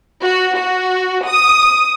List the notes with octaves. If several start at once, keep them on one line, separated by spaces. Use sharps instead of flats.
F#4
F#4
D#6